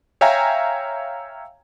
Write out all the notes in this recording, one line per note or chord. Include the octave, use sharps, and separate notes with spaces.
C#5 E5 F5 G5 G#5 A#5